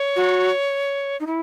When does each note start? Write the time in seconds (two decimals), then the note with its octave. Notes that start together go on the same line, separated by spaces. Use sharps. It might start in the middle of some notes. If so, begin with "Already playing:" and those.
Already playing: C#5
0.16 F#4
1.20 D#4
1.27 E4